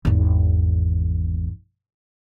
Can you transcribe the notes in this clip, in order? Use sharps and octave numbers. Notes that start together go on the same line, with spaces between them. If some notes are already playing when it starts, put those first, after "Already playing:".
G#1 E2